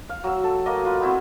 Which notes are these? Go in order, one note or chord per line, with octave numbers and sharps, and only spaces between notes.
F5
F#3 E6
A4
A3 A#3 D#5
F4 B4
B3 C4 E4 F#4